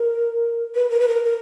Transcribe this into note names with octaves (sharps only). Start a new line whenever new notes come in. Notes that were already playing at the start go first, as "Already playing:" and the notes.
Already playing: A#4
B4
A#4
B4
A#4
A#4